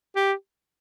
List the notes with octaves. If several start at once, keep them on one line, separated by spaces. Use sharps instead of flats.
G4